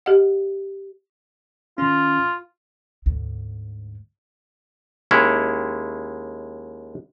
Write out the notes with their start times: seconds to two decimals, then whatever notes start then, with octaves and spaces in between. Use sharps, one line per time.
0.06 G4 D#5 F#5
1.78 D#3 C#4 F4
3.06 D2 G#2
5.11 D#2 G#3 C#4 E4 C#5